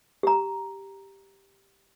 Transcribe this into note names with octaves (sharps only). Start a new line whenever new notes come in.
G4 A#5